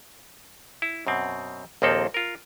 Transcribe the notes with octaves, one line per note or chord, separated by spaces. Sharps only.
E4
F#2 B2 C4
A#1 D#2 F3 A#3 C4 A4
F4 A#4